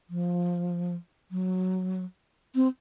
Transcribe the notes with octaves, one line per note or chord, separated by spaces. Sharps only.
F3
F#3
C4